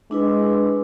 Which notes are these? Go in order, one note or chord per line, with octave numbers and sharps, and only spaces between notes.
G#3 D4 E4 B4